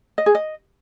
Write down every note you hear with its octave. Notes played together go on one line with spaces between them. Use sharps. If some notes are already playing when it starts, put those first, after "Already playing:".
D#5
G#4
D#5